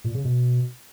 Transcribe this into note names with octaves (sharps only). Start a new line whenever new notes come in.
A#2
C#3
B2